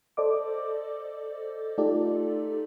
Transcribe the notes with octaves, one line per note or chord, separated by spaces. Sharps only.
A4 C5 D5 D#5 D6
A3 D#4 F4 G4 A4 D5